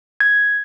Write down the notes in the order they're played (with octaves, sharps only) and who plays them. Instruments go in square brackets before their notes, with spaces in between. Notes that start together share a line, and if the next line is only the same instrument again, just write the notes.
[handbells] G#6